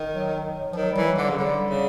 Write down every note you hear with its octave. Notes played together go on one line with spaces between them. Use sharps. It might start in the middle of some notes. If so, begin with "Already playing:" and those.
Already playing: D#3
F#3
F3
D#3 F#3
G3
E3
F#3
D3
G3
C#3 F#3
D3 G3
C#3